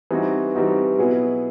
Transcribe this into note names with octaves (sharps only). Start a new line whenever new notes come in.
E3 G3 C4 D#4 F#4
E3 G3 C4 D#4 F#4
B2 F#3 B3 E4 G#4